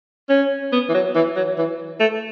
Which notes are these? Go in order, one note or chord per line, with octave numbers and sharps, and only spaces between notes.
C#4
B3
E3
F#3
E3
F#3
E3
A3